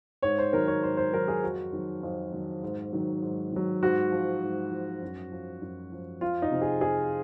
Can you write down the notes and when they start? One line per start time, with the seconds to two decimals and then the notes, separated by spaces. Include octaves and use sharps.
0.23 G#2 C#5
0.38 C5
0.53 D#3 F#3 A#4
0.68 C#5
0.83 G#2 C5
0.97 C5
1.13 D#3 F#3 A#4
1.28 G#4
1.43 F2 F#4
1.73 D#3 F#3
2.03 F2
2.32 D#3 F#3
2.63 G#2
2.93 D#3 F#3
3.22 G#2
3.52 D#3 F#3
3.83 G#2 F#4
4.12 F3
4.42 G#2
4.72 F3
5.02 F#2
5.32 F3
5.62 F#2
5.92 F3
6.21 F2 F4
6.42 D#4
6.51 C3 F3
6.62 G#4
6.81 F2 G#4